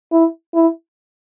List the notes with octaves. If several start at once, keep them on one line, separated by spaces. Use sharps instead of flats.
E4
E4